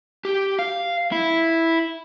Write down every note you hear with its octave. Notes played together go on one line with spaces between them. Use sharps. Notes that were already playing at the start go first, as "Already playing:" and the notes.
G4
F5
E4